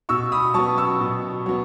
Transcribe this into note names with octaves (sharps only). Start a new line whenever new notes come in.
B2 C#6 E6
B5 D#6
F#3 B3 A5 C#6
C#6 E6
B2
F#3 B3